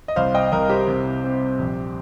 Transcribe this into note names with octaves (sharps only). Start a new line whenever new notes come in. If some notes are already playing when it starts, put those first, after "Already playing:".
D#5
C2 C5 F5
D#5 G5
C2 A#4 D#5
G4 C5
C3
C4
A#1